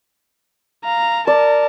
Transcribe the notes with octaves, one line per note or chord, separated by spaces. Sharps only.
F5 A#5
A#4 D5 A5